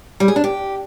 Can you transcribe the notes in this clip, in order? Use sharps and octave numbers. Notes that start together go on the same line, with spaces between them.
G3
G#4
D4
G4